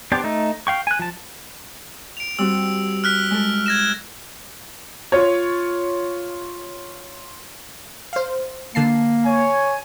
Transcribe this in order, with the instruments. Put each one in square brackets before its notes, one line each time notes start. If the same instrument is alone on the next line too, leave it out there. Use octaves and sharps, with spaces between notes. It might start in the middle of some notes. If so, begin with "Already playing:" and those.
[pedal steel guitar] B3 D4 G4 C5 D5
A3 D#4
F5 G5 C#6
G#5 F#6
F3 A5
[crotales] D7 F7
[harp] G3 C4 F#4 [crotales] E6
[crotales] F6 F#6 B6
[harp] G#3 A4
[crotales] G#6 A#6 E7
[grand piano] F4 C#5
[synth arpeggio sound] C5 F5
[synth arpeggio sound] D3 A5 C7 [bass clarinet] A#3
[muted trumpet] C#5 [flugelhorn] G#5